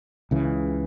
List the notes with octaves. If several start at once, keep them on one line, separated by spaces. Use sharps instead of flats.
C#2 C#3 E3